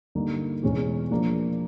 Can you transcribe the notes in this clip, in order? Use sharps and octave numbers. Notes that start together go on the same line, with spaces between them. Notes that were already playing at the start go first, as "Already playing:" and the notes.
G2 D3 G3 A#3 D#4
E2 B2 G#3 C#4
F3 A#3 D4